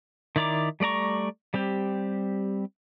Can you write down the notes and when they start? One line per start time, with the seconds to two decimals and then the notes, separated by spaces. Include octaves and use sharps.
0.36 D#3 E4 D5 A#5 D6
0.80 G3 A3 D5 A#5 C#6
1.54 G3 C4 G4